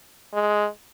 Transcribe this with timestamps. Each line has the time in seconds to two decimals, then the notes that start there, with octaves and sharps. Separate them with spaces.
0.33 G#3